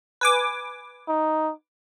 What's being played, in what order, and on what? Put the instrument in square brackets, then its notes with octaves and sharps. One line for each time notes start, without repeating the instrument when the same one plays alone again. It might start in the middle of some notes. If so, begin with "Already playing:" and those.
[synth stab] B4 G#5 D6
[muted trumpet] D#4